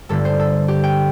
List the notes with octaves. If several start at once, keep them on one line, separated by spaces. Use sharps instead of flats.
G1 G2 D3 A3 A4
C5
A4
G4
G5